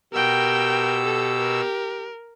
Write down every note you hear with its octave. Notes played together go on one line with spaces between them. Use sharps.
B2 G4 A#4 G5 E6
A4
A#4